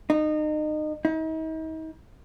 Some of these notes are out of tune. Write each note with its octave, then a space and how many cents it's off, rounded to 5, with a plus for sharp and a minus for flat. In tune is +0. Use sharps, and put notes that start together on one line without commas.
D#4 -30
D#4 +40